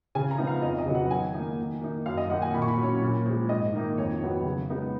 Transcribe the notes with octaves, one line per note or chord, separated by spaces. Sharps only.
C#3 G#5
A#5
F3 B3 D#4
F5
F2 D#5
D#5
C#3 F#3 B3
F#5
D#3 G#5
A#3 D#4
D#3
A#3 D#4
F#2 F5
D#5
D#3 A#3 D#4 F#5
G#5
A#2 B5
C#6
B5
F#3 C#4
A#2
F3 G#3
G#2 D#5
D#3 A#3 D#4
F2 C#5
D#3 F#3 B3
C#3
G#3 B3 D#4